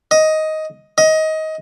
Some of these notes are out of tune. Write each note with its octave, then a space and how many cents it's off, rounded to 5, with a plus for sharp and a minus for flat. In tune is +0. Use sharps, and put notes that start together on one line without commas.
D#5 +10
D#5 +20